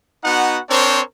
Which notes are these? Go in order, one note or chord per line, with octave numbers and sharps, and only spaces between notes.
B3 D#4 F#4 F#5
C4 D4 A#4 C5 C#5